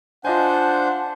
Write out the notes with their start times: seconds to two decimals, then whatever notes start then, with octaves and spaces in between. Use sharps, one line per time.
0.25 D4 F4 C5 D#5 F#5 G#5 A5 G6